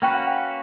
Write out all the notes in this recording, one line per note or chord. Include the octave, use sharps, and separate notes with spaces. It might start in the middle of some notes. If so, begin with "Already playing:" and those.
A#3 C#4 F#4 B4 G5
F#5
G5